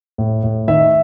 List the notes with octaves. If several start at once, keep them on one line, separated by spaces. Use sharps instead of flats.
A2
A2
D#3 E5